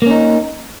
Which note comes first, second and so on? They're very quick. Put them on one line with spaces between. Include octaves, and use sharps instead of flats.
A#3 C#4 D#4